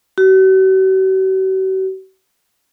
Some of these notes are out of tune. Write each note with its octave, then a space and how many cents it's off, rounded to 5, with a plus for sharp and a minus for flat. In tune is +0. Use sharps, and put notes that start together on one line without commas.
F#4 +45